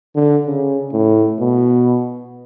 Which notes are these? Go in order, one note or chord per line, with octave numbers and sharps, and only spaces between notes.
D3
C#3
A2
B2